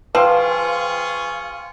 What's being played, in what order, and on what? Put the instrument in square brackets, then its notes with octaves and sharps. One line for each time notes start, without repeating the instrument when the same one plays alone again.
[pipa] F3 [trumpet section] F4 G#4 C#6 [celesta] B4 [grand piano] F5 G5 C6